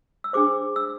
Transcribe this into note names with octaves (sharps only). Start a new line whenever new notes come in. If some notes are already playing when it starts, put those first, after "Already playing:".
E6
D4 G#4 C5 D6
E6